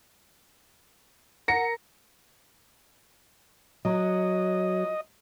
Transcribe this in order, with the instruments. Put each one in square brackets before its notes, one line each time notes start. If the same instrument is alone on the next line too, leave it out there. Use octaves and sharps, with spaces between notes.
[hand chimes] A#4 A#5 [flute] F#5 [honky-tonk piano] A#6 C#7
[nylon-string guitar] F#3 [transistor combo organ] D#5